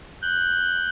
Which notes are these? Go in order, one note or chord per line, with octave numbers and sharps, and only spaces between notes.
F#6 G6